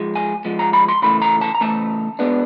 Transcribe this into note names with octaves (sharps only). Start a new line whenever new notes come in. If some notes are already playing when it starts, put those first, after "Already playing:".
Already playing: G#2 F3 G#3
G#5
G#2 F3 G#3
A#5
B5
C6
C#3 E3 A3 B5
A#5
A5
A#5
C#3 E3 A3 A5
B2 G#3 B3 D4